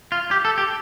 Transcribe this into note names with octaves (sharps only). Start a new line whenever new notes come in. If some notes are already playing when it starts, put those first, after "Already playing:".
F4
G4
A4
G4